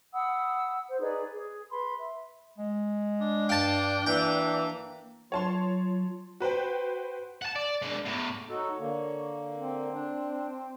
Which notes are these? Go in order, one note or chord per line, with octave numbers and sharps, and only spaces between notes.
F#5 B5 D#6 E6
C5
D#4 G#4 B4 D5
G#4
B4 B5 C6
E5
G#3
D4
G2 F5 G5 A5
E3 A#3 G5
F#3 F4 C#5 A5 C6
F#4 B4 C5 G5
F#5 A5
D5
G#3 D4
E2 A2
D#4 F#4 A4 C#5
D3 A#3
C4
D4